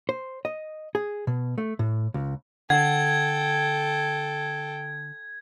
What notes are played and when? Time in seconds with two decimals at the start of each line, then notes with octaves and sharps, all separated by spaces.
0.09 C5
0.45 D#5
0.95 G#4
1.27 B2
1.58 A3
1.79 A2
2.14 C#2
2.70 D3 A4 F#5 G5 G#6